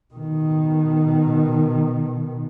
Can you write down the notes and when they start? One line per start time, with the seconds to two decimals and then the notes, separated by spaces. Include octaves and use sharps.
0.14 B2 D#3